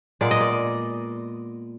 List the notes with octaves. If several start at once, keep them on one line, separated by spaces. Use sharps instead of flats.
A#2 G#3 B3 D5
D#5
D5